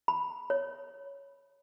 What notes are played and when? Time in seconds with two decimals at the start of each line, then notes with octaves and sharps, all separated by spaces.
0.08 B5
0.50 C#5